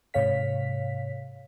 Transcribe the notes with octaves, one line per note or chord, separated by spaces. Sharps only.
G#2 C3 C#5 F5 B6